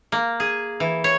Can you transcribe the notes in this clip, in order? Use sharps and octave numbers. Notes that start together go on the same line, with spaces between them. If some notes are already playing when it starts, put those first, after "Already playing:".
A#3
G#4
E3
C#5